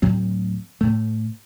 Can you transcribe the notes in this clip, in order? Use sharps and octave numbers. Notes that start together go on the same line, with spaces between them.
D2 A2 F#3 C4
A2 A3